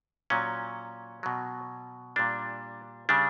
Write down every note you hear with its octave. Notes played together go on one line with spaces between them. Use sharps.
A#2 F#3 C#4
B2 F#3
A#2 G3 D4
C#3 G3 D4